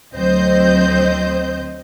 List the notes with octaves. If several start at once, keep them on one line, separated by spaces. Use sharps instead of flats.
D2 F#3 C4 C5 D#5 G6